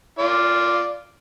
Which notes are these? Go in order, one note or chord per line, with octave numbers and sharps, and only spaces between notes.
F4 D5